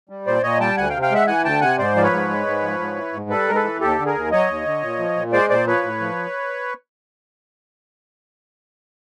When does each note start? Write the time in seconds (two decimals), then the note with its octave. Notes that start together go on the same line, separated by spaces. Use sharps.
0.09 G3
0.26 A#2 C5 D5
0.43 A#2 C#5 D#5
0.60 G3 G5 A5
0.77 D2 F#5 G#5
0.89 F5 G5
0.94 C3
1.02 F5 G5
1.11 G#3 E5 F#5
1.27 E3 F#5 G#5
1.44 D2 G5 A5
1.61 C3 F#5 G#5
1.78 G#2 C5 D5
1.96 F3 D5
2.03 B4 C#5
2.11 G#2
2.29 G#3
2.46 G#2
2.62 F3
2.79 G#2
2.96 E3
3.13 G#2
3.30 G3 A4 B4
3.47 G#2 A#4
3.55 A4 B4
3.64 E3
3.81 D#2 G4 A4
3.99 D3
4.06 G#4 A#4
4.15 D#2
4.31 F#3 C#5 D#5
4.48 D#2
4.66 D3
4.82 A#2
4.99 F3
5.16 A#2
5.32 G#3 C5 D5
5.50 A#2 C5 D5
5.66 F3 B4 C#5
5.84 A2
6.00 F3